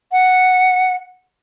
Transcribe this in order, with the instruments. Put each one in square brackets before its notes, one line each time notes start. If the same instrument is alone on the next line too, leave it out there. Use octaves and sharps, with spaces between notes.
[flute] F#5